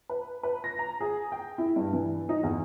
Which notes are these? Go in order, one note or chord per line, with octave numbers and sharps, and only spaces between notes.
B4
B4
A#6
A#5
G#4
G5
E4
G2
E3
D#4
E2